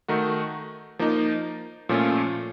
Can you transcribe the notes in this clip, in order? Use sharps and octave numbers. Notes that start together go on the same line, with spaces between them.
D#3 A3 D#4 F#4
F3 A#3 D#4
A#2 F3 A3 C#4 F4